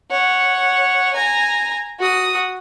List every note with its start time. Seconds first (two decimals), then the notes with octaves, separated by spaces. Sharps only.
0.11 C#5 F#5
1.13 G#5 A#5
1.99 F#4 D#6